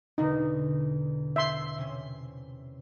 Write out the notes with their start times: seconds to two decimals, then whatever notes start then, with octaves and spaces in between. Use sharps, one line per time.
0.18 E2 B2 D3 D#4
1.36 E5 C6 G6
1.78 C3 C#4